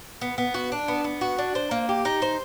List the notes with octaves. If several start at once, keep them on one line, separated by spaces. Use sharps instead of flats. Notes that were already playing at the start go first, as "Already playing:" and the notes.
B3
B3
F#4
D4
B3
B3
F#4
D4
C5
A#3
G4
D#4
C5